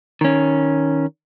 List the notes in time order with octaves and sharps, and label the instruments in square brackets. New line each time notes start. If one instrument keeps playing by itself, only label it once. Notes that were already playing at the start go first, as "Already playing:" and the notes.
[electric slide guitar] D#3 C#4